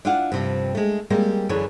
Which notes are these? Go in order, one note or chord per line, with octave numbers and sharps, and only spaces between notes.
D4 E4 F4 F5 F#5
G2 C3 F3
G#3 A3
G3 G#3 A#3 C4
F#2 D3 E3 D4 G#4 C#5